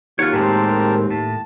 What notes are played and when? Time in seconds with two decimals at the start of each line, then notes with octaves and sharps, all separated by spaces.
0.19 D#2 F4 F#4 C#5 F#5
0.33 A2 G#3 C4 G4 A#4 A5
1.10 A2 A5